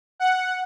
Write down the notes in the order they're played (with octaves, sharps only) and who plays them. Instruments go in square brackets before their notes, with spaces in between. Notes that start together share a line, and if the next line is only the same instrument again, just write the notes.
[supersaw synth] F#5